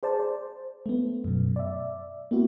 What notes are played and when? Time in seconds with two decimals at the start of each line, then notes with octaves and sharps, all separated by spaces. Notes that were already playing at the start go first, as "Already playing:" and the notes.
0.03 G#4 C5 D5 A5
0.20 C5
0.86 A3 B3
1.24 F#2 B2
1.56 D5 E5
2.31 A#3 B3 E4 F#4